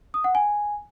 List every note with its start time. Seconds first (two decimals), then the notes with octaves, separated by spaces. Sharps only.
0.14 D#6
0.24 F#5
0.35 G#5